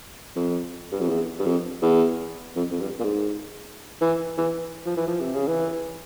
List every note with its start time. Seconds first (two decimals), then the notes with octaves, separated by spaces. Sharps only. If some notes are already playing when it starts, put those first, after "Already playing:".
0.36 F2
0.92 G2
1.00 F2
1.09 E2
1.40 G2
1.46 F2
1.82 E2
2.56 F2
2.71 F2
2.80 G2
3.00 A#2
3.04 G#2
4.02 E3
4.38 E3
4.86 F3
4.97 E3
5.08 F3
5.21 C3
5.35 C#3
5.48 E3